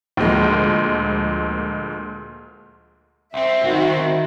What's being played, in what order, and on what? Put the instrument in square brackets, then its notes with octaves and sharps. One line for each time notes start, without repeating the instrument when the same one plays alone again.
[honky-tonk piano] D2 A#2 F3 G#3 A#3
[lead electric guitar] C2 C4 [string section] E5
[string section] D#3 E4 F#4